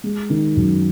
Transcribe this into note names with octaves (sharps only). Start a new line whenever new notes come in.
G#3
D#3
F#2